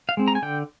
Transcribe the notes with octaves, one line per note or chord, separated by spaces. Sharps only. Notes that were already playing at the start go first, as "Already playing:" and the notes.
F5
G#3 C4
A#5
G#5
D3 G5